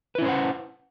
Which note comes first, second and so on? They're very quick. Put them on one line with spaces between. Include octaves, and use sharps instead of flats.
B4 E4 C#4 C5 F#5